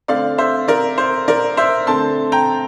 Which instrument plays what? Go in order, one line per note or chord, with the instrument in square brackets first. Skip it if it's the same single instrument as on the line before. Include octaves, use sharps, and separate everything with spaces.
[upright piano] D3 A3 C4 D5 F5
C5 E5
A#4 D5
C5
A#4 D5
C5 E5
D3 A3 C4 A5 C6
G5 A#5